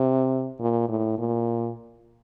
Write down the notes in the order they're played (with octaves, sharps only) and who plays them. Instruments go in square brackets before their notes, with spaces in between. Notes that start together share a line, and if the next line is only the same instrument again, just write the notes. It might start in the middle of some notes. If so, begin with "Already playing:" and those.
Already playing: [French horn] C3
A#2
A2
A#2